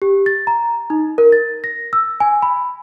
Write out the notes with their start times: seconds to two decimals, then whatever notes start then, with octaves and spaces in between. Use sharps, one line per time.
0.02 G4
0.26 A6
0.47 A#5
0.90 D#4
1.18 A#4
1.32 A6
1.64 A#6
1.93 E6
2.20 G#5
2.42 B5